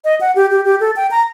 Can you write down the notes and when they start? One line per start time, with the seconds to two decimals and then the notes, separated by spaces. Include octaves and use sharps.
0.05 D#5
0.21 F#5
0.36 G4
0.51 G4
0.65 G4
0.80 A4
0.96 G5
1.11 A#5